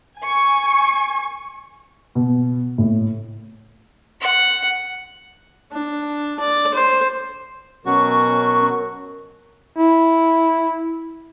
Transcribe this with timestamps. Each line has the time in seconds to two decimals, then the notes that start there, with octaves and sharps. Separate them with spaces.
0.19 G#5 C#6
2.15 B2
2.78 A2
4.21 F#5
5.72 D4
6.40 D5
6.75 C5
7.86 B2 F#3 C#4 F#4 A#4 C#6
9.77 E4